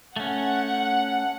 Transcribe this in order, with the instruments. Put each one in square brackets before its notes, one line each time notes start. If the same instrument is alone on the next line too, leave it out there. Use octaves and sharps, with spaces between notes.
[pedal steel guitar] A3 C#4 [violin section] F#5